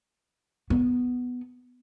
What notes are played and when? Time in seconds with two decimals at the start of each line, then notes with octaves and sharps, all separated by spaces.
0.70 B3